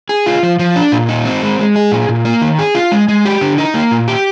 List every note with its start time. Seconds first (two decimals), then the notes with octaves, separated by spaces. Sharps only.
0.09 G#4
0.26 F4
0.43 F3
0.59 F3
0.76 D4
0.92 A#2
1.09 D#4
1.25 C4
1.43 G#3
1.59 G#3
1.76 G#4
1.92 A#2
2.09 A#2
2.25 A#3
2.42 D#3
2.59 G#4
2.75 F4
2.92 G#3
3.08 G#3
3.25 G4
3.41 D3
3.58 D#4
3.74 A#3
3.91 A#2
4.08 G4